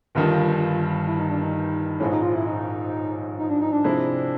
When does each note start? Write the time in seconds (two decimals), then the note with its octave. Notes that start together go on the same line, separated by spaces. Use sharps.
0.15 G1 G2 D#3 G3 F4
1.07 E4
1.19 D#4
1.30 D4
1.42 D#4
1.99 A#1 G#2 F3 G#3 C#4 E4
2.11 D#4
2.23 F4
2.34 E4
2.46 D#4
3.38 D#4
3.50 D4
3.62 D#4
3.73 D4
3.84 C3 F3 G#3 C4 E4